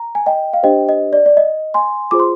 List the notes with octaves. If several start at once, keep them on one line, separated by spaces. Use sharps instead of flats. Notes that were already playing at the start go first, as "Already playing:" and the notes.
Already playing: A#5
G#5
D#5 G5
F5
D4 G4 C5 D#5 G5
D#5
D5
D5
D#5
G#5 C6
F4 G#4 C5 D6
C6